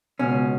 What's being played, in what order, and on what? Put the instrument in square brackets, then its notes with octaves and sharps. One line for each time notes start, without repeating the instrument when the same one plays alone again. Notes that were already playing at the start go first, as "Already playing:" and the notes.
[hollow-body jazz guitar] C#2 B2 C#4